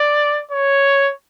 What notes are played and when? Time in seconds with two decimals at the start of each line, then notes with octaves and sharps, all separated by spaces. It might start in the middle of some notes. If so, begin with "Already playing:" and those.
Already playing: D5
0.51 C#5